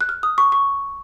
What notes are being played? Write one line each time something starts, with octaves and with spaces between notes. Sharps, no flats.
F#6
F6
D#6
C#6
C#6